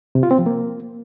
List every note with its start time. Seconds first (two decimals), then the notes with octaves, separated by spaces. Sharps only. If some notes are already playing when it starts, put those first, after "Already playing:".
0.15 C3
0.23 F4
0.31 C4
0.39 F3
0.46 A#3